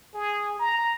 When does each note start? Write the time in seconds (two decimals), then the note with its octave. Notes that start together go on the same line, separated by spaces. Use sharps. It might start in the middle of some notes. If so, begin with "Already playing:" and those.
0.14 G#4
0.59 A#5